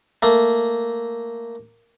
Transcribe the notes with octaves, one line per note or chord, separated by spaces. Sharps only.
A3 A#3